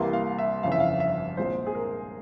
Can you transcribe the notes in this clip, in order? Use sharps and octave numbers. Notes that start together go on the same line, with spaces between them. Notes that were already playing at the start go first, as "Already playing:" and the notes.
Already playing: C2 C3 E3 G3 A#3 C6
F5
E5
G1 F2 C#3 E3 F5
E5
F5
E5
C2 A#2 G#3 C4 C5
G#4
A#4